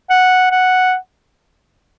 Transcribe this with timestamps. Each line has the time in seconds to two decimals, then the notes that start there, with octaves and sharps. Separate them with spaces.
0.10 F#5
0.51 F#5